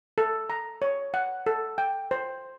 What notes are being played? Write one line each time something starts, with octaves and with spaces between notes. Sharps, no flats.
A4
A#5
C#5
F#5
A4
G5
C5